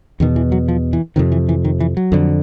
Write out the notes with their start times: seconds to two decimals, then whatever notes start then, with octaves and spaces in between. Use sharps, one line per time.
0.20 E2 B2 D#3
0.36 E3
0.52 F#3
0.68 F3
0.93 E3
1.16 F2 C3 D#3
1.32 E3
1.49 E3
1.65 D#3
1.80 E3
1.97 F#3
2.12 F2 D3